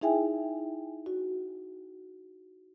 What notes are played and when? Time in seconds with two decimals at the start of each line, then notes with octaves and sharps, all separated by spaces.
0.01 D#4 E4 G#4 E5 G5 G#5
1.06 F#4